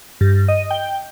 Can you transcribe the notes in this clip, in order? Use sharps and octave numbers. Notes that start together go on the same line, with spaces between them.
G2
D#5
G5